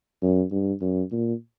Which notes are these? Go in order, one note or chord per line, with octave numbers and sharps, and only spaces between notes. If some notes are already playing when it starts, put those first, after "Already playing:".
F#2
G2
F#2
A#2